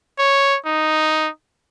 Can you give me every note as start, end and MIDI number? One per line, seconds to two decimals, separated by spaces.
0.19 0.57 73
0.66 1.29 63